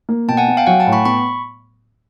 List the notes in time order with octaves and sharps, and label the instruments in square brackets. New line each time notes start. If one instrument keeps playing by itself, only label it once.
[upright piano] A#3
[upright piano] B2 [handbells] G5 A5
[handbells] F#5 G#5
[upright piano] B3
[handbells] F5 G5
[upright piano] F#3 [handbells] F#5 G#5
[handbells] G5 A5
[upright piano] A2
[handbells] B5 C#6
[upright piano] B3 [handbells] B5 C#6